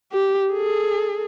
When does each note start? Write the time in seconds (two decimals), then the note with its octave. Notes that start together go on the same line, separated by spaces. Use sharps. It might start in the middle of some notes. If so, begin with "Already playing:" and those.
0.12 G4
0.52 G#4 A4